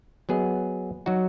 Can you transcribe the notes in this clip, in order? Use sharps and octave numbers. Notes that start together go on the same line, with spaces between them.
F#3 B3 G#4 D#5
F#3 D#4 F#4